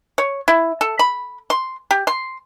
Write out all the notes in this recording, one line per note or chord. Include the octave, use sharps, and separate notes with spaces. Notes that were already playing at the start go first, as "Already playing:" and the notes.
C#5
E4
A4
B5
C6
G4
C6